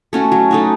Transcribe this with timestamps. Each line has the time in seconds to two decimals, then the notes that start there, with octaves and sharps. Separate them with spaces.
0.13 A3 C#4 F#4
0.32 F#3
0.51 A3 D#4 F#4